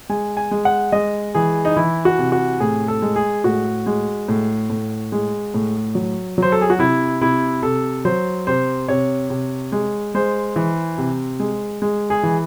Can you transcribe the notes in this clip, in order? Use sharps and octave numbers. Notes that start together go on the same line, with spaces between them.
G#3 G#5
G#5
G#3
F#5
G#3 D#5
E3 G#4
D#4
E3 E4
F#4
C3
F#4
A2 G#4
A4
G#3
G#4
A2 F#4
G#3
A2
A2
G#3
A2
F#3
F#3 C5
A4
G#4
F#4
C3 E4
C3 E4
C3 A4
F#3 C5
C3 C5
C3 C#5
C3
G#3
G#3 C5
E3
C3
G#3
G#3
G#4
E3